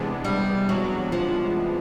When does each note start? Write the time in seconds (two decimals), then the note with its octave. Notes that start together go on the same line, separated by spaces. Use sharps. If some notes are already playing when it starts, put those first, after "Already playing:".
Already playing: C3 E3 G#3 B3 D4
0.24 G3
0.69 F#3
1.12 F3